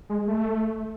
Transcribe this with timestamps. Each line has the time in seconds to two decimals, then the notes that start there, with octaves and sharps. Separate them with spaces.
0.10 G#3
0.28 A3